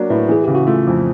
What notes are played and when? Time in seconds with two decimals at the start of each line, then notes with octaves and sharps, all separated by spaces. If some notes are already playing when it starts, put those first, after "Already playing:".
Already playing: F#3 A#3 D4
0.10 A2 B4
0.29 E3 G#4
0.44 C#3 G4
0.55 F#4
0.67 A3 F4
0.87 F2